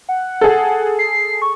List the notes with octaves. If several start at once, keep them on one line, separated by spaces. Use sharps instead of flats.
F#5
G#4 A4
C7
C#6